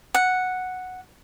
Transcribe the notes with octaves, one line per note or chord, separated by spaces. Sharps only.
F#5